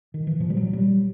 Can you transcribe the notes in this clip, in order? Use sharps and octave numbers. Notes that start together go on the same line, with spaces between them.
D#3
E3
A#2 F3
G3
F#3
G3